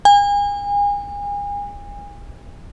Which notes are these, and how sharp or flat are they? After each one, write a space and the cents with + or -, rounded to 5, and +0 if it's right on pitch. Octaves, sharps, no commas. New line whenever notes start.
G#5 -35